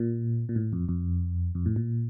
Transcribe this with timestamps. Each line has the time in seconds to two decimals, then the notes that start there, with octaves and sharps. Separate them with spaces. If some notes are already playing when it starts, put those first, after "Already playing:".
Already playing: A#2
0.49 A#2
0.56 A2
0.73 F2
0.89 F2
1.55 F2
1.66 A2
1.76 A#2